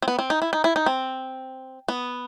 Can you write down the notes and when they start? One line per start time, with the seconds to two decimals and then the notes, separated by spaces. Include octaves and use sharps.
0.02 C4
0.08 B3
0.19 C4
0.30 D#4
0.42 E4
0.53 D#4
0.64 E4
0.76 D#4
0.86 C4
1.88 B3